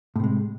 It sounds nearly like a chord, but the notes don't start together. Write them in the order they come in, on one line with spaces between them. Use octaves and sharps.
A2 C3 G#3